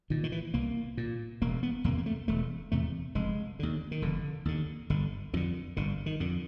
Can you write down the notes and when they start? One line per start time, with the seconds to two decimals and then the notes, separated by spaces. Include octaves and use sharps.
0.10 A#2 D#3
0.24 D#3
0.32 E3
0.54 C2 A#3
0.97 A#2
1.42 E1 A#3
1.63 B3
1.84 E2 C3 A#3
1.98 A#3
2.06 A3
2.28 E1 A3
2.72 E2 C3 A3
3.15 F1 G#3
3.59 D#2 D3
3.91 D#3
4.02 F1 D3
4.45 D#2 D3
4.90 G1 D3
5.33 F2 D3 D#3
5.77 G1 D3
6.06 D#3
6.20 F2 D3